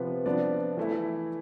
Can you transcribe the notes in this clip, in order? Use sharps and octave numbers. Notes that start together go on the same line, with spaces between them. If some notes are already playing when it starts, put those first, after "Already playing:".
Already playing: C3 F3 B3 B4
F3 B3 D4 D5
E3 A3 E4